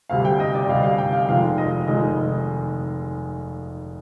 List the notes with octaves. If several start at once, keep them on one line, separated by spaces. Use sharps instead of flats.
D2 C3 G3 F5
G5
D#5
D5
D2 C3 G3 F5
F5
G5
F5
F1 F2 D#3 G#3 F5
D#5
F1 F2 D#3 G#3 D#5